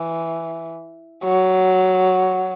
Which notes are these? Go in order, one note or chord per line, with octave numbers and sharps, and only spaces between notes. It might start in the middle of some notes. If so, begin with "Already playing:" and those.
Already playing: E3
F#3